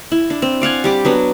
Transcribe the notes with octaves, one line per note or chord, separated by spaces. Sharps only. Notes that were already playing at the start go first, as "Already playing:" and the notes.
E4
D4
C4
D5 F5 F#5 G#5
G3 G4 D6
F#3 B3 D4